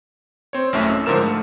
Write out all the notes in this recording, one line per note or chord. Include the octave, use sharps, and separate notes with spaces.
C4 C#5
A1 F#2 A2 C#4 E5
E6
G#2 D3 F3 A#4 E7
A3